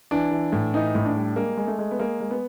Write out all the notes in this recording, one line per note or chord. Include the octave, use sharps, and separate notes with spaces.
E3 D4
E3
A2
E3 D#4
A2
D4
G3
G#3 A#3
G#3
A3
G#3
B3
G#3 A#3
G#3
B3